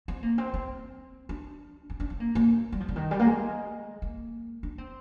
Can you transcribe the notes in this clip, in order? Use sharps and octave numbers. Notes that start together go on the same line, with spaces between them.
C4
A#3
C4
C4
D4
C4
D4
C4
A#3
A#3
G3
F3
D3
D#3
G3
A#3
G#3
A#3
D4
C4